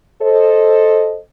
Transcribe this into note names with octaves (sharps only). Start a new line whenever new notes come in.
A4 C5 D#5